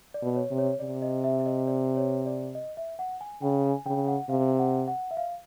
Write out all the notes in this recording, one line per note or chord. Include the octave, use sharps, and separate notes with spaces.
D5
B2
C#5
C3
C#5
C3 D5
D#5
E5
E5
D#5
D5
D5
C#5
D5
D#5
E5
F#5
G#5
C#3 G5
G#5
C#3 G5
F#5
C3 F5
F#5
F#5
E5
F5